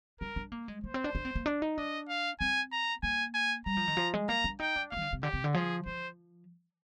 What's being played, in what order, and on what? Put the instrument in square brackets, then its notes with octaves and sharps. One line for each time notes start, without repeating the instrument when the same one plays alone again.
[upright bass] D4 [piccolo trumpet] A#4
[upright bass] D4
A#3
G#3
[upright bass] A#3 [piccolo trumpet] C5
[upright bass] C4
D4
D4
C4
A#3
D4
D#4
[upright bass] D4 [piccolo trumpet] D#5
[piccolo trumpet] F5
[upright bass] C4 [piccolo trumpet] G#5
[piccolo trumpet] A#5
[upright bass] A#3 [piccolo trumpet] G#5
[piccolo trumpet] G#5
[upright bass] G3 [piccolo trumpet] A#5
[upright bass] F3
D#3
F3
G#3
[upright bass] A#3 [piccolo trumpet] A#5
[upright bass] D4
[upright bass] D#4 [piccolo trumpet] G5
[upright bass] D4
[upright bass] A#3 [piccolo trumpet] F5
[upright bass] D#3
D3
C3
[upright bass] D3 [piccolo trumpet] G4
[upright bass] C3
D3
[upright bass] F3 [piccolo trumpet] G#4
[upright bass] F3 [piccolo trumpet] C5